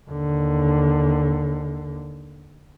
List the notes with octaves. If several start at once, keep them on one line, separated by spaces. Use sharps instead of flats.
D#2 D3